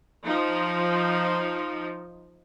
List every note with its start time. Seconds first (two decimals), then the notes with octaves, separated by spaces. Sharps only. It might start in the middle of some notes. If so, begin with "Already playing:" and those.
0.24 F3 D#4